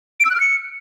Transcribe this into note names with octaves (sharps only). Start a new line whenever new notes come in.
D7
E6
F#6
F6
C#7